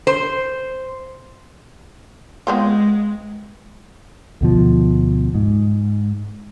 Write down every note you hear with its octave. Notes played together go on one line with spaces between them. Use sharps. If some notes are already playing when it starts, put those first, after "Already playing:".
C5
G#3 B3 C4 F4
D2 B2 F3
G#2